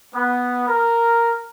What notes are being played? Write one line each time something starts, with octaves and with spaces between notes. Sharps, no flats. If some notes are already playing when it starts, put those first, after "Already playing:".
B3
A#4